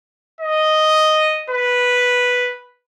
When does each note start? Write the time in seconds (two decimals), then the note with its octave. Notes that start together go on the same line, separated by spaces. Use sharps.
0.40 D#5
1.50 B4